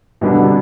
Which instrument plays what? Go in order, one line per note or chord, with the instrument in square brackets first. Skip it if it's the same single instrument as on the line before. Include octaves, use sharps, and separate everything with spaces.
[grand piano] B2 G3 B3 D4 [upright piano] E3
[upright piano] D3
C3